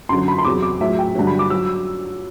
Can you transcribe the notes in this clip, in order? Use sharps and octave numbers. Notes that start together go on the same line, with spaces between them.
F#2 D3 F#3 C6
B5
C6
E2 C3 F#3 D6
D6
A2 F#3 E5
G5
G2 D3 F#3
B5
D6
F#3 E6